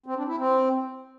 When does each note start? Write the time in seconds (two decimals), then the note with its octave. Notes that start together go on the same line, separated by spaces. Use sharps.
0.06 C4
0.17 D4
0.27 E4
0.38 C4